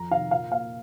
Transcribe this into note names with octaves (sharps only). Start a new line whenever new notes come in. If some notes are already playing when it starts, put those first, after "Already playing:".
Already playing: F2 A#5
C3 D#3 F5
A#2 F5
A#3 F5